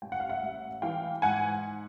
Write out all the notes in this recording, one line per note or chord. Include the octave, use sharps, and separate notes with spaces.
A1 G5
F#5
F5
E5 F#5
A1
E3 F5 G5
G#2 F#5 G#5